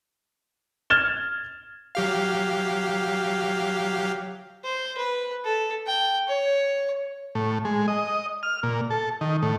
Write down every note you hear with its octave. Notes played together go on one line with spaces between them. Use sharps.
F6 G#6 A6 E7 G7
F#3 G4 F5
C5
B4
A4
G5
C#5
A2
G#3
D#5
F6
A#2
A4
D#3
A2